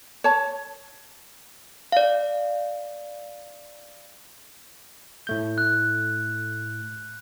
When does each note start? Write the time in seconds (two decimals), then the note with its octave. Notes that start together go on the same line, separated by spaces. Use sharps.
0.24 C#5 A5
1.92 D5 F5
5.27 A2 A3 G6
5.58 F#6